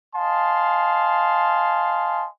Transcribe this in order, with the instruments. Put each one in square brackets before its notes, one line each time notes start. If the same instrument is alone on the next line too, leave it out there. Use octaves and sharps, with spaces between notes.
[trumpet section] D#5 F5 G#5 A5 C6